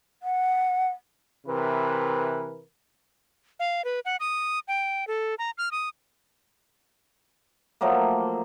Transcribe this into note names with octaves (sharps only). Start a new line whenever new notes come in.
F#5
C3 E3 A#4 B4
F5
B4
F#5
D#6
G5
A4
A#5
F6
D#6
F3 F#3 A3 A#3